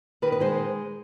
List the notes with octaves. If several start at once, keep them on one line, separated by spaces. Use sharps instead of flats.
D#3 B4
B4
G#3 C5